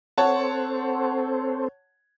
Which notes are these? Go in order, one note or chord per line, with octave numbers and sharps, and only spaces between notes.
C4 A4 C5 C#5 F#5 A5